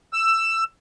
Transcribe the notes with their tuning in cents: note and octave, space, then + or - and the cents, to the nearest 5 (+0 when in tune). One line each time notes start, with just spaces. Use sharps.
E6 +15